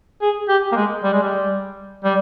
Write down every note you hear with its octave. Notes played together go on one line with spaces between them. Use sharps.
G#4
G4
A#3
G#3
G3
G#3
G3
G3